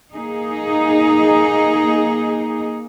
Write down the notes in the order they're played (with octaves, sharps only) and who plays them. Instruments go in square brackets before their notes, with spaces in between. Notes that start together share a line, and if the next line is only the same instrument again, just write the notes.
[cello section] A#3 D#4 G#4